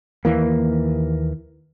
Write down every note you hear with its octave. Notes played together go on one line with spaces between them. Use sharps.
D#2 E3 A#3